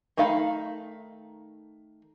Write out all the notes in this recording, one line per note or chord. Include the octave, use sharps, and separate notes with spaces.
D#3 A3 D#4 F5 B5